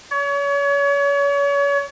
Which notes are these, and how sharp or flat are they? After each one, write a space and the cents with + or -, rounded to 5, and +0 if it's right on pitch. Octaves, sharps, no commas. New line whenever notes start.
C#5 +35